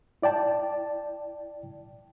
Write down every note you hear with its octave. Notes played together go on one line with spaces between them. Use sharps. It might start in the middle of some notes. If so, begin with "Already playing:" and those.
E4 D5 G5 A5